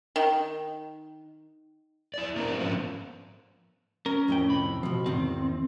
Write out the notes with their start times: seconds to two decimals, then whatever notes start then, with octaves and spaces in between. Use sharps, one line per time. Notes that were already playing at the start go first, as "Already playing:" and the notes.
0.16 D#3
2.14 E4 D5
2.36 A3 A#3 C4 D4 E4 A#4
2.59 G#2 D3 F3 B3 C#4
4.06 C#4 A#4
4.28 F2 A2 G5
4.50 C3 B5
4.83 B2 F3
5.06 E2 G#2 D#3 C4